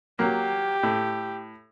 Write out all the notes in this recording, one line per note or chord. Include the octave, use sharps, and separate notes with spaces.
F#3 A#3 G4
A2